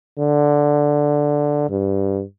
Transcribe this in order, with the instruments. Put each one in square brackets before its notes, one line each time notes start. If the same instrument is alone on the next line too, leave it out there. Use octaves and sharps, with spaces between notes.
[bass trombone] D3
G2